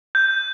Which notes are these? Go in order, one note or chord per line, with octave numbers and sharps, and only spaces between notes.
G6